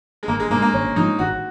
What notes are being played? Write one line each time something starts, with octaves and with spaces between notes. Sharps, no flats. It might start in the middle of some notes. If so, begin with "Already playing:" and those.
G#3
G#1 A#3
G#3
G#2 F3 G#3 A#3
A#3
G#1 C#4
G#2 F3 G#3 D#4
G#1 F#4